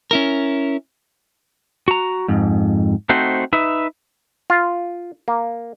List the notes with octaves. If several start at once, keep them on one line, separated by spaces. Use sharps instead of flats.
C#4 E4 A#4
F#4 A#5
F2 G#2
A3 C4 D#4 F#4 C5
D#4 B4 E5
F4
A#3